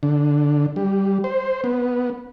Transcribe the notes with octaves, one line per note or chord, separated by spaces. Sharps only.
D3
G3
C5
B3